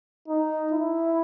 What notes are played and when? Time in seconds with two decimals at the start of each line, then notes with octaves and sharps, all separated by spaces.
0.28 D#4
0.72 E4